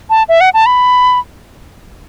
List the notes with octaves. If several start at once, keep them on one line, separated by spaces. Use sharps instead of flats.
A5
E5
F#5
A5
B5